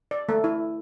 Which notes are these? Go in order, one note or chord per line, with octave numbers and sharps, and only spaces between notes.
D5
A3
E4